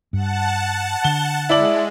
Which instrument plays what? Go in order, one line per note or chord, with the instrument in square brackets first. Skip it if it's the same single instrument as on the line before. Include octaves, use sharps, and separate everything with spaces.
[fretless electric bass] G2 [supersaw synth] F#5 A5
[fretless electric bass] D3 [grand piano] G7
[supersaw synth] G#3 [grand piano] E4 D5 F#7